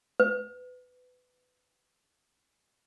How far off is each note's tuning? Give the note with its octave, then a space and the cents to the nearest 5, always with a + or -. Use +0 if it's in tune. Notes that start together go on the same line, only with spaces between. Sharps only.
B4 +20